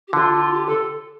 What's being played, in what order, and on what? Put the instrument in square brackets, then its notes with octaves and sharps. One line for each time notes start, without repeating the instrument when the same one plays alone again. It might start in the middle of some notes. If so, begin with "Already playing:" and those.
[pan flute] G4
[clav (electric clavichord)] D3 [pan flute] F4
[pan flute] F4
G4
A4